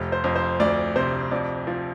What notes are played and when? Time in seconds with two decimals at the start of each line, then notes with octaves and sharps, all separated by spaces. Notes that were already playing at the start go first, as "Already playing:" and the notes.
Already playing: F1 C3
0.12 C5
0.24 F2
0.36 C5
0.60 D2 D5
0.96 C3 C5
1.31 F2 D5
1.67 F3